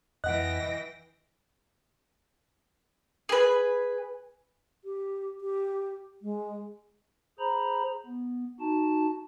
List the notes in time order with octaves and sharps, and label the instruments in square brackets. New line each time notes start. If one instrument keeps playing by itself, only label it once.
[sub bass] F2 [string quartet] E3 G5 A#6 [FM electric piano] D#5 [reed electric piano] F#5 F#6
[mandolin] G#4 B4
[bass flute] G4
G4
G#3
[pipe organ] G#4 C5 A#5 B5
B3
D#4 F#4 A5